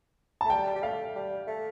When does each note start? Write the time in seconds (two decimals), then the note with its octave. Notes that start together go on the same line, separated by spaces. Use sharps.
0.41 A3 A5
0.50 G3 G5
0.76 G3
0.82 A3 F5
1.15 G3
1.47 A3